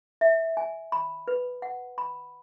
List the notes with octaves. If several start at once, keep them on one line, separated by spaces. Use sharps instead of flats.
E5
G#5
B5
B4
F#5
B5